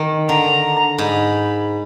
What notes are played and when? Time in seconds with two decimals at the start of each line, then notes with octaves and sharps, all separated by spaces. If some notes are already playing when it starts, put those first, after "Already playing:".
Already playing: D#3
0.29 D3 A#5
0.98 G#2 B5